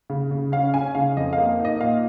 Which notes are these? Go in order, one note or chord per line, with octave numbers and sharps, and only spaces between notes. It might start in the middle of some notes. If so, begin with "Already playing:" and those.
C#3
C#3
C#4 F5
C#4 G#5
C#3 F5
F2 D#5
F5
A#3
D#4
D#5
A#2 F5